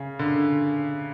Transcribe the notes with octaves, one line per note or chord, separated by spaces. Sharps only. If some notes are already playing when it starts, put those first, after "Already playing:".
Already playing: C#3
D3